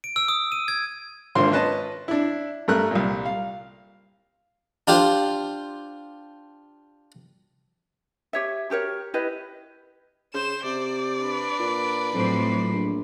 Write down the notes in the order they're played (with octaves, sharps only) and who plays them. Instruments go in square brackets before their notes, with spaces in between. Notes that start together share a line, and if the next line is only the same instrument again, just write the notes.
[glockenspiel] D7
E6
D#6
D#7
G#6
[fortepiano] G#1 D3 A#3 F4 C5 C6
C#4 B4 D#5 A5
D4 E4
G2 A3 A#4 F#6
C2 A#2
F5
[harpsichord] D4 F4 G4 C5
[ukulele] G4 C#5 E5
F#4 G4 A#4 C#5
E4 G4 B4 D#5
[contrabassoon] C#3 [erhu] C5 [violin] E7
[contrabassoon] C3 [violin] C5 [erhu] D5
[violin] D4 B4
[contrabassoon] A#2
[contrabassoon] F2 [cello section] A2 F#3 C5
[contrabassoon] A#1